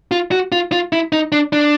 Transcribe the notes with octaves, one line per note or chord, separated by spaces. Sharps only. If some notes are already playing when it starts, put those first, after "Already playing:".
F4
F#4
F4
F4
E4
D#4
D4
D4